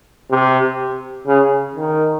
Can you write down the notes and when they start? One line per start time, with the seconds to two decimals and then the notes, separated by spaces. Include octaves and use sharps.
0.30 C3
1.26 C#3
1.75 D#3